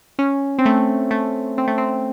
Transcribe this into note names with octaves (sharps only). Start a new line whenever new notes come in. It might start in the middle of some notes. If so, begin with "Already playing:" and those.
C#4
C4
A3
A3
C4
A3
C4